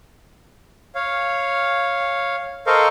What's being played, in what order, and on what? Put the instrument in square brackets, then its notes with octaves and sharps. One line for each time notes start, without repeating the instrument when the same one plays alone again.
[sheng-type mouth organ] C#5 F5
A4 A#4 C5 D#5 F5 C#6